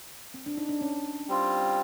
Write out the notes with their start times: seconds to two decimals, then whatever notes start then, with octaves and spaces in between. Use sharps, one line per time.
0.34 C4
0.46 D4
0.57 D#4
0.69 D4
0.81 C#4
1.28 G3 C4 F4